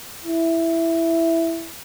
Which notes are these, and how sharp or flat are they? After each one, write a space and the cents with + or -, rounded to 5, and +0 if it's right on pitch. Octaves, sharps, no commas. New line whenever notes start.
E4 +5